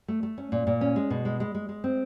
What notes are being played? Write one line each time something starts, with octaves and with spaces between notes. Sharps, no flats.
A3
A3
C#4
A#2
A#2
C#4
G#3
B2
G#3
G#3
G#3
G#3
C4